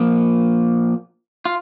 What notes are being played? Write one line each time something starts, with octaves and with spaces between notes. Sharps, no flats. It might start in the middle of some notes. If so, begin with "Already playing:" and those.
Already playing: A#2 F3 A#3
F4